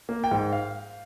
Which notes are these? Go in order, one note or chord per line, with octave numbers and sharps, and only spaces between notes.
A#3
G5
G#2
F5